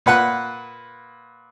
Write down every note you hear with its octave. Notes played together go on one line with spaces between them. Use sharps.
A#2 B4 F#5 F#6